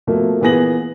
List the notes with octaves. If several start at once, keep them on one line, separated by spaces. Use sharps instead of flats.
B2 F3 A3 A#3
A#2 E3 B3 G#4 A#6 F#7